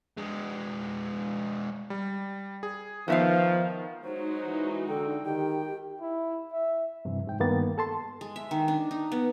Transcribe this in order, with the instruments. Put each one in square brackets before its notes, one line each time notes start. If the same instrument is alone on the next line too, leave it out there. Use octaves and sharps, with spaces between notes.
[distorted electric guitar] G#3 D4
[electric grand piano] G3
G#4
[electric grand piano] D#3 B3 [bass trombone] F3 [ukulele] B4 E5 F5
[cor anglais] F#3 [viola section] G#3 D#4 F#4 [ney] C5
[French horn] E3
[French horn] D3 [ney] A4 [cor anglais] G5
[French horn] D#3 [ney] G4 [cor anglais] G5
[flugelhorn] E4
E5
[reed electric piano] G2 C3 E3
G#2 G5
G2 D#3 A#3 B3 A6
A4 A5 C6
[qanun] G#3
E5
D#3
D4
D#4
B3